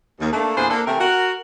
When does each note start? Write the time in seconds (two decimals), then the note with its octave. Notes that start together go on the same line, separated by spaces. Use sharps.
0.20 D#2
0.32 A3 A#3 D4
0.57 E2 A#2 D4 E4 G#4 C5
0.70 A#3 D4 A4
0.86 C3 E3 A3 A#4
1.00 F#4 A#4